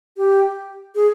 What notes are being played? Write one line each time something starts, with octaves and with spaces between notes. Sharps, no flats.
G4
G#4